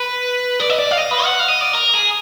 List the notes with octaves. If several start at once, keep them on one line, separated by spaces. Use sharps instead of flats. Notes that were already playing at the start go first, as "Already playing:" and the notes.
Already playing: B4
D5
D#5
D5
F5
D#5
B4
F#5
F5
D#5
D5
A#4
G#4